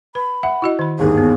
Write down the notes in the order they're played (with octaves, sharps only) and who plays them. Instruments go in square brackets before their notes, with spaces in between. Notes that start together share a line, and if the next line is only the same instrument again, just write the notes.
[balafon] B4 [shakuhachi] B5
[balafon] E5 [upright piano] F#5
[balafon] E4 F#4 D#5
D#3 B5
[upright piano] G1 D#2 G#2 [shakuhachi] G#4
[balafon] B3